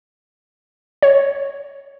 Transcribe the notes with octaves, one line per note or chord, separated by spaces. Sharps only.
C#5